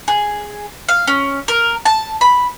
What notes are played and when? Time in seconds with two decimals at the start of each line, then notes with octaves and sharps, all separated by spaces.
0.08 G#4
0.89 F5
1.07 C#4
1.48 A#4
1.85 A5
2.21 B5